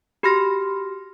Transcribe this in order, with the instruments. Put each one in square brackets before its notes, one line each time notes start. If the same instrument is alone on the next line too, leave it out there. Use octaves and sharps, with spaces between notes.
[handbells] F#4 G4 B5 C6 F6 A#6